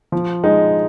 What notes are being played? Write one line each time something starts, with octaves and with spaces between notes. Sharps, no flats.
F3
G#3 D#4